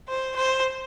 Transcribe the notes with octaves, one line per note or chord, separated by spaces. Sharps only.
C5
C5